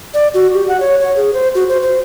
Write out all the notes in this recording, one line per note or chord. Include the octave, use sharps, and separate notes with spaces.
D5
F#4
G4
F#5
C#5
C#5
G#4
C5
F#4
C5
C5